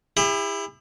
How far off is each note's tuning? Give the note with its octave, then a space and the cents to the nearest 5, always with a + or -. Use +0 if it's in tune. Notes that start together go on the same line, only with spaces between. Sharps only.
E4 +0 G4 +45